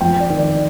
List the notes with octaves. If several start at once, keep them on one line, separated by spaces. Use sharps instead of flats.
F2 G5
D5
D#3
D5